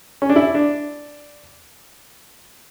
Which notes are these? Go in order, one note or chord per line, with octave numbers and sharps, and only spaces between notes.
C#4
D4
E4
D4